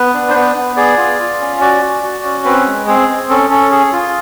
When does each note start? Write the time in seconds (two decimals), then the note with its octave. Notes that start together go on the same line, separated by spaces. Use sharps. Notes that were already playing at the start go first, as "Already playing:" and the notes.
Already playing: B3 B4
0.14 D4
0.30 C5
0.34 B3 B4
0.56 B3
0.77 G#4 D5
0.97 F4
1.19 F4
1.40 C#4
1.61 F#4 D5
1.82 F#4
2.03 F#4
2.24 C#4
2.45 C4 B4
2.66 G#3
2.87 C4 G#4
3.08 C4
3.30 C#4 A4
3.50 C#4 A4
3.71 G#4
3.92 F4